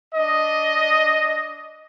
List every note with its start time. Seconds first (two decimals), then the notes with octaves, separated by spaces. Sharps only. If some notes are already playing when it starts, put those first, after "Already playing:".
0.15 D4 D#5